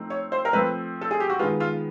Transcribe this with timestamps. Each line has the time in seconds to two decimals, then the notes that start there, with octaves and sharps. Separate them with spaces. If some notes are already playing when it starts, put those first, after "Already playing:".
Already playing: F3 A3 C4 D#4
0.10 C#5
0.32 C5
0.45 A#4
0.53 F3 A3 C4 B4
1.01 A4
1.11 G#4
1.20 G4
1.29 F#4
1.39 D#3 G#3 B3 F4
1.60 F4